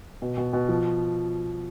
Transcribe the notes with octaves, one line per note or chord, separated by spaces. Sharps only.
B2
B2
B2
F3